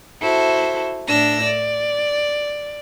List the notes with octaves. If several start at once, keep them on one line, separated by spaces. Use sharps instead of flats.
E4 F#4 A4 C5
A2 D4 E6 A#6
D5